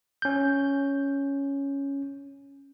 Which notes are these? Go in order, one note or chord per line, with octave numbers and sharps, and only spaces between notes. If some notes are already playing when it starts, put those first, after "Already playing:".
C#4 G6